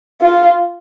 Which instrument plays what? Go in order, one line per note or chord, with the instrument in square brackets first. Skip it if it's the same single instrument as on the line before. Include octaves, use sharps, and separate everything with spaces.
[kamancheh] F4